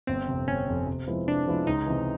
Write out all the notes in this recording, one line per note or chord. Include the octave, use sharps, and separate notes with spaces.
G1 C4
F2 C3
G1 C#4
F2 C3
C3
F3 G#3 B3 E4
C3 D4
F3 G#3 B3 E4
C#2 D#4
C3 E3